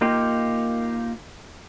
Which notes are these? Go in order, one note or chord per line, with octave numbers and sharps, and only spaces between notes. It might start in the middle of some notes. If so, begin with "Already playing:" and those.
A#3 D#4 F4 G4 A#4